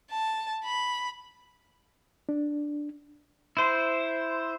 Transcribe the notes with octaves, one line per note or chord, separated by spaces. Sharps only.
A5
B5
D4
E4 C5